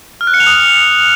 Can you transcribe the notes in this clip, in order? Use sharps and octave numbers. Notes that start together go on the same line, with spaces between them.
F6
F#6
C#7
F7
D#6